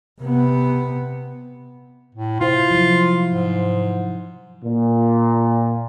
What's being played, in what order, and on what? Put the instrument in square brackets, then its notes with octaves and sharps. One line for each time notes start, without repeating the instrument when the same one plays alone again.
[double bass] C3 B3
[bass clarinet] A2
[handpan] C3 E4 C5 [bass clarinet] F4
[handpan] F3 F#3
[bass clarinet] G#2
[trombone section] A#2